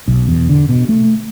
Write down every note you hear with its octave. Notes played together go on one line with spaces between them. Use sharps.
B1
E2
D3
B2
A3